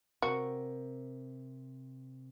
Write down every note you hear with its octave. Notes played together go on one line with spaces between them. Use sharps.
C3 C4 F#4 A#4